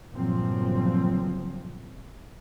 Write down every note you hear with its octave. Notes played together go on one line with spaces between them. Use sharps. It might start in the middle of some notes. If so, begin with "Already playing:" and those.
G1 A#2 C#3 F3 F#3 C4